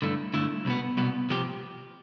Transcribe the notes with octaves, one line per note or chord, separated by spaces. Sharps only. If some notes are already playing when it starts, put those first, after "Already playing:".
G2 D3 A3 E4
G2 D3 A3 E4
C2 B2 B3
C2 B2 B3
C3 F3 C4 G4